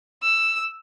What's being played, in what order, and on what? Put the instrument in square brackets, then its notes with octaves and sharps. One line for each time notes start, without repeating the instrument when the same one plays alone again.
[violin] E6